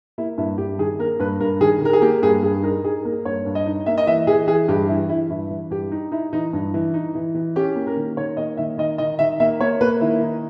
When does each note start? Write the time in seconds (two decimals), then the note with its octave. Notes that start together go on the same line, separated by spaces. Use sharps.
0.18 A#3 E4
0.38 G2 E4
0.58 G2 G4
0.78 D#3 G#4
0.99 A#3 A#4
1.19 G2 B4
1.40 G2 A#4
1.61 D#3 G#4
1.82 D#3 A#4
1.93 G#4
2.01 A#3 G4
2.22 G2 G#4
2.42 G2 G#4
2.63 D#4 A#4
2.83 D#4 G#4
3.05 A#3 A#4
3.25 G2 C#5
3.46 G2
3.55 D#5
3.66 D#4
3.86 A#3 E5
3.98 D#5
4.07 E3 E5
4.27 E3 G#4
4.47 E3 G#4
4.68 G2 G4
4.88 E3 E4
5.09 E3 E4
5.30 G2 E4
5.50 E3
5.70 G2 G4
5.92 D#4
6.12 D#4 E4
6.33 E3 D#4
6.53 G2
6.74 E3
6.94 D#4
7.15 E3
7.34 E3
7.56 C#4 G4
7.75 A#3
7.87 A#4
7.97 D#3
8.17 D#3 C#5
8.37 A#3 D#5
8.57 D#3 E5
8.78 D#3 D#5
8.98 D#3 D#5
9.19 D#3 E5
9.40 A#3 E5
9.60 A#3 C#5
9.81 A#3 B4
10.01 D#3 E4
10.21 D#4